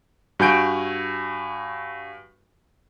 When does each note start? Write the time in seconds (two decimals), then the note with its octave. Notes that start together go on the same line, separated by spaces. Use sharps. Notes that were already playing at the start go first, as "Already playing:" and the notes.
0.39 G2 F#4 G#5 G6 D7